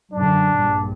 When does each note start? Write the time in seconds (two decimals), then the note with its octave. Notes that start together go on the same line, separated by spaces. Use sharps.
0.12 F#2 D3 D4
0.54 A#1 G2